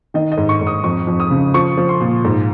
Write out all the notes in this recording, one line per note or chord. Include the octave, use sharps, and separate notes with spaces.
D#3 D#5
D#5
G#2
C#6
G#2
D#6
F2 C#6
F2
D#6
C#3
F3 C#6
F3
C6
A#2
G#2